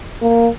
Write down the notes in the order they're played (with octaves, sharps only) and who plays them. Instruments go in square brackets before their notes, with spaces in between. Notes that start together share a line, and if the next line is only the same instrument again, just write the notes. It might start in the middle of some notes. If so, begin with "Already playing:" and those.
[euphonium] A#3